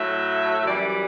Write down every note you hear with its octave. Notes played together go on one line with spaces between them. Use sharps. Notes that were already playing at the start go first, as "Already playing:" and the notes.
Already playing: A2 F#3 A3 E5
F#2 E3 G3 D5
D5